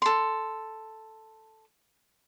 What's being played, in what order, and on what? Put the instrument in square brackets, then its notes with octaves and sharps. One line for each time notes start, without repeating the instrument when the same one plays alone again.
[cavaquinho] A4 C6